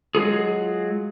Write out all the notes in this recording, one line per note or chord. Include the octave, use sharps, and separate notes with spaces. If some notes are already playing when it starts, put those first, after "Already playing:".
F#3 G#3 F4 G#4